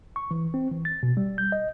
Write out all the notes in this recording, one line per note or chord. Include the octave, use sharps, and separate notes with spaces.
C#6
E3
C4
E3
A6
B2
G3
G6
D#5